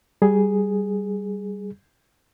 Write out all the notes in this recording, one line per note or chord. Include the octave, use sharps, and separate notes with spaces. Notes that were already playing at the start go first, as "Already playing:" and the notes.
G3 G#4